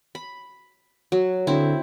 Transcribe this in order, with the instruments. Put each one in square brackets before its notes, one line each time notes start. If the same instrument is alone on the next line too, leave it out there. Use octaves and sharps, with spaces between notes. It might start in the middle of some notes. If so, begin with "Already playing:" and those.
[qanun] B5
F#3
[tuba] D3 [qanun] C4 E4